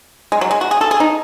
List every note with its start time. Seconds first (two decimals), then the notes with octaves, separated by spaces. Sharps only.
0.32 G#3
0.41 F#3
0.51 G#3
0.61 F#4
0.71 G#4
0.81 A4
0.91 G#4
1.00 D#4